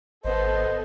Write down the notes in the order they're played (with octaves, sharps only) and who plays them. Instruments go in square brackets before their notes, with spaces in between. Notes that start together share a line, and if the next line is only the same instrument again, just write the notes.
[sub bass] G#1 [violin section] B3 A4 [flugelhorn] C5 [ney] D#5